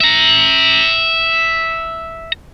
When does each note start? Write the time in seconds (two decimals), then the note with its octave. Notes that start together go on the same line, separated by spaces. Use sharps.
0.01 E5 A#5